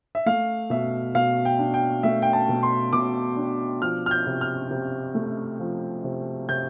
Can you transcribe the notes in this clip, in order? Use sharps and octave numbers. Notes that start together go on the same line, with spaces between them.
E5
A3 F5
B2 E5
B2 F5
G5
D4
G5
A3 E5
G5
A5
B2
C6
B2 D6
D4
F3 F6
F6
G6
C3
F6
C3
A3
F3
C3
C3 G6